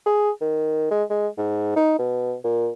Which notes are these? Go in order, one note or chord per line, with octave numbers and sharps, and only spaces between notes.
G#4
D#3
G#3
G#3
G#2
D#4
B2
A#2